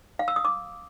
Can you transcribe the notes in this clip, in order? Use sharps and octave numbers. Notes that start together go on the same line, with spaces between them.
F5
E6
D#6
D6